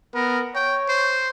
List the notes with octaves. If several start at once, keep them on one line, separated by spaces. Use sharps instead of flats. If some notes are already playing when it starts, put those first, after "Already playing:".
B3 A#4
C#5 G5
C5